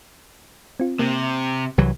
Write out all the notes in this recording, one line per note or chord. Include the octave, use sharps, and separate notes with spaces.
C4 F4
C3 A#3
C2 E3 F#3